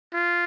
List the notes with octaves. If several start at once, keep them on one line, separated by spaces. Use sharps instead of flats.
F4